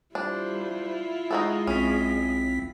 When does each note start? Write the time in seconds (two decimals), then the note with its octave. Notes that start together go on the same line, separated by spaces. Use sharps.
0.15 G3 D4 E4 F4 C5
1.31 G#3 D#4 F#4 A4 D#5
1.67 B1 C4 C#4 B6